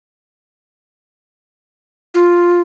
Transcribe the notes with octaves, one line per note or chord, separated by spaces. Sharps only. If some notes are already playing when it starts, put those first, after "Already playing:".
F4